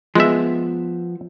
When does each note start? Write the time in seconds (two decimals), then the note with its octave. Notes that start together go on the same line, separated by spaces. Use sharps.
0.15 F3 G#3 B3 E5